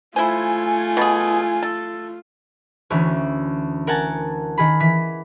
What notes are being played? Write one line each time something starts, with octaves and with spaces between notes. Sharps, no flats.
A3 E4 F4 C5 G#5
B2 G#4
A4
D2 E3 C#4
A#4 F#5 G#5 A5
D#3 G#4 B5
E3 B6